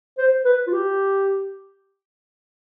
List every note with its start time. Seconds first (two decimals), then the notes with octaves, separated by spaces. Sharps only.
0.18 C5
0.45 B4
0.67 F4
0.73 G4